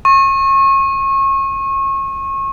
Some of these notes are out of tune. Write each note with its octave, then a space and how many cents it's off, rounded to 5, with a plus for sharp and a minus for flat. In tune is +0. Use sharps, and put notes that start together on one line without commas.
C#6 -30